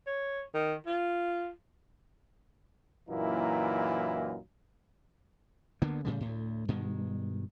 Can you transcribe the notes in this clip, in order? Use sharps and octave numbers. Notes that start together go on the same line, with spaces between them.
C#5
D#3
F4
F#2 A#2 E3 A#3 D#4 E4
D2 D3 A#3 B3
A2 C#3 G3
D2 A2
G2 B2 D#3 G#3